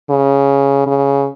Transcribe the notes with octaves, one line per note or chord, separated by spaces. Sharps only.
C#3
C#3